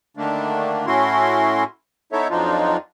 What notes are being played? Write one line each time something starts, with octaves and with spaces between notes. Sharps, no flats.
D3 D#3 A3 A#3 D4
A2 A3 C#4 E4 F#4 C6
B3 D#4 E4 A4 C#5 E5
F2 F3 F#3 D4 D#4 F4